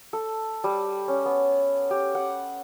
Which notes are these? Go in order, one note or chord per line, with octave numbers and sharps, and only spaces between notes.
A4
G3
C#4
B3
G4
F#5